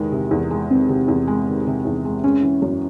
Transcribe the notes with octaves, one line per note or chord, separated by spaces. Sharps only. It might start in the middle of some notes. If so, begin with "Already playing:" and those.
Already playing: E2 C3 D#3 G#3
C3
E2
G#3
D#3 C4
C3
E2
G#3
D#3
C3
E2
G#3
G#3 C#4
E3
F#2